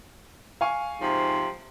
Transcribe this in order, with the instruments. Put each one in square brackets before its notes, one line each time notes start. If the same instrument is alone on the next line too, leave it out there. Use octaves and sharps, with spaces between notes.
[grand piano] F5 G#5 C#6
[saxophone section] G#2 C3 F3